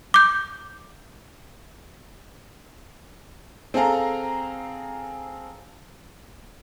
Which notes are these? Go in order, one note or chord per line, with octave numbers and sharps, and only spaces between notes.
D6 G6
C4 G#4 A4 F5 A#5